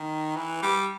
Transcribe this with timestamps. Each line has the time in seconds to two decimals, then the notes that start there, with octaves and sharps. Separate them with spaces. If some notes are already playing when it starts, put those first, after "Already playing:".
Already playing: D#3
0.36 E3
0.62 G3